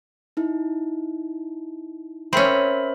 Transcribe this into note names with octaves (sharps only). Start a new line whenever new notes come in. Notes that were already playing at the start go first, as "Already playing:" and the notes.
D#4 E4
C4 C#4 A#4 E5 B5